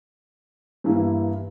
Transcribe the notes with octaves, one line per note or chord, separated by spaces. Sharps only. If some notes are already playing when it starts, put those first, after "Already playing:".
G2 E3 A#3 E4